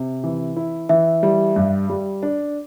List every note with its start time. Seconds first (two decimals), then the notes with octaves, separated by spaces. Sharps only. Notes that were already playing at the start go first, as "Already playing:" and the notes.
Already playing: C3
0.24 E3
0.56 E4
0.89 E3 E5
1.23 G3
1.56 G2
1.90 G3
2.23 D4